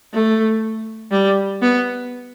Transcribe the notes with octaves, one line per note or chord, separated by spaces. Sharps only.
A3
G3
B3